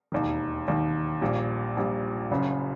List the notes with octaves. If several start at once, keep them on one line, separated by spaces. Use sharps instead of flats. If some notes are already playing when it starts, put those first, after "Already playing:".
E1 D#2 D#3
E1 D#2 D#3
A#1 A#2 G3
A#1 A#2 G3
F#1 F#2 C#3